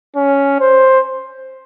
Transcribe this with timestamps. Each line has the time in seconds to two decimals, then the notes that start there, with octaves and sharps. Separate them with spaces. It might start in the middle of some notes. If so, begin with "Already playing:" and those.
0.16 C#4
0.60 C5